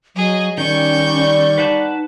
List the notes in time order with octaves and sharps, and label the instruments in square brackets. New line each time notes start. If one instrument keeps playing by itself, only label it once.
[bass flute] F#3 [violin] G#4 D#5
[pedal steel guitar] D#3 [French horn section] G3 D5 [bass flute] C#4 [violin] C#6 G6
[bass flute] D#4 [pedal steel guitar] B4 F#5 A5